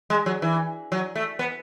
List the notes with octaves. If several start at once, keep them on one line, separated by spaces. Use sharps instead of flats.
G#3
F#3
E3
F#3
A3
B3